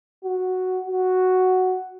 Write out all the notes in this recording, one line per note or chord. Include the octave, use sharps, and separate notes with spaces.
F#4
F#4